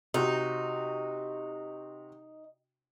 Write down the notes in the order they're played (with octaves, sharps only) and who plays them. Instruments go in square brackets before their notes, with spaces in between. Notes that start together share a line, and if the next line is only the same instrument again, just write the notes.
[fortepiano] C3 F#4 [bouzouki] D#4